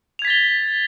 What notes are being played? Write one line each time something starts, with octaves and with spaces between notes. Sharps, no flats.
G#6 A6 B6 F7 G7